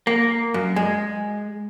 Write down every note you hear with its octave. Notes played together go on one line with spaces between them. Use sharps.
A#3
F#2
G#3